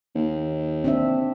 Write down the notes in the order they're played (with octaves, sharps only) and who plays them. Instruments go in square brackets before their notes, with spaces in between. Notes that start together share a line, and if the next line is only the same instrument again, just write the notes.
[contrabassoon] D#2
[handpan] C4 D4 E5